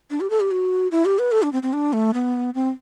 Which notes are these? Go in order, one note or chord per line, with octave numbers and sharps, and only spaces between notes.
D4
G4
A4
G4
F#4
E4
G4
B4
A4
D4
C4
C4
D4
A3
B3
C4